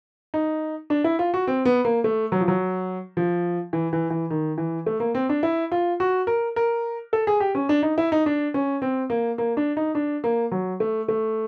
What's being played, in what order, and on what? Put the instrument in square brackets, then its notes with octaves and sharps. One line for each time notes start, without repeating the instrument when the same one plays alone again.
[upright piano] D#4
D4
E4
F4
F#4
C4
B3
A#3
A3
F#3
F3
F#3
F3
E3
E3
E3
D#3
E3
A3
A#3
C4
D4
E4
F4
F#4
A#4
A#4
A4
G#4
G4
C#4
D4
D#4
E4
D#4
D4
C#4
C4
A#3
A#3
D4
D#4
D4
A#3
F#3
A3
A3